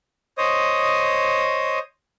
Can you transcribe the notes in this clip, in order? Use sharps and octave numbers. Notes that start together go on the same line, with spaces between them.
C5 C#5 D#5 D#6